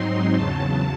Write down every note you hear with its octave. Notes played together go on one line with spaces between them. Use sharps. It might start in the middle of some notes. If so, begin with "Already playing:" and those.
Already playing: G#2 F#3 C4 D#4 C6
E2 C#3 F#3 A5